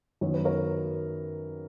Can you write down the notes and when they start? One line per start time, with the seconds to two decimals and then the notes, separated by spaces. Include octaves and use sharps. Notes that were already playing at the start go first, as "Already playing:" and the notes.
0.21 F#2 D#3 F#3 B3 C#5
0.34 B4
0.45 A#4 C#5